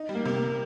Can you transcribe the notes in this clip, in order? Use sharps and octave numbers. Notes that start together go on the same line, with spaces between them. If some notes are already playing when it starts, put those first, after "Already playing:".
Already playing: D#4
G3
A#3
C3
A#3